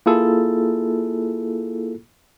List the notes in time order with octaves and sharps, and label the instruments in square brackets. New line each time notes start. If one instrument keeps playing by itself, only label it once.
[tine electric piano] A#3 E4 F4 G#4 A4